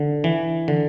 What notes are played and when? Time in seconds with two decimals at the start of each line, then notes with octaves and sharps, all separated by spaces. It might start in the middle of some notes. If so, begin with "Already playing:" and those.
Already playing: D3
0.24 E3
0.68 D3